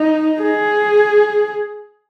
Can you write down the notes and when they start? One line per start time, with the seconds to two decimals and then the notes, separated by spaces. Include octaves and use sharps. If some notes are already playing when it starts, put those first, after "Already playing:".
Already playing: D#4
0.42 G#4